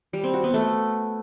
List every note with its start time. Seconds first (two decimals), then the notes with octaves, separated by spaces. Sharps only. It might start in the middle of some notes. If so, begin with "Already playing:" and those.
0.13 G3
0.23 C4
0.34 F#4
0.44 B3
0.54 A3